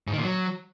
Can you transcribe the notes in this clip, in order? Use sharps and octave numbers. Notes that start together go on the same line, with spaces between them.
G#2
D#3
A#2
F#3